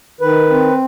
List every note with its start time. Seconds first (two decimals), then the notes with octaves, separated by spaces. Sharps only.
0.21 D#3 B4
0.50 C4